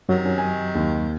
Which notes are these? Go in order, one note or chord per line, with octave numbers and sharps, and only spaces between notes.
F#2 C3 D#3 F#3
C#4
G#5
D#2